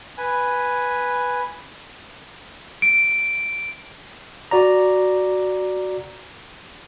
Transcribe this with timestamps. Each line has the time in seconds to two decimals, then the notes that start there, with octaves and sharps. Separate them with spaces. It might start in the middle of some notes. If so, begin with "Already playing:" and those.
0.18 B4 G#5
2.82 D7
4.51 F#4 D5 A#5